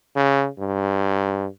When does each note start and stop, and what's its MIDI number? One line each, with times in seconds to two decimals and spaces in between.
0.16 0.48 49
0.58 1.47 43